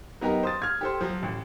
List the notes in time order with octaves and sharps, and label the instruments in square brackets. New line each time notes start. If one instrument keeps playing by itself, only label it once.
[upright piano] F#3 B3 D#4 G4 A#4
C5 D#6 A6
F6 G#6
G4 A4 C5
F3 F#3
A1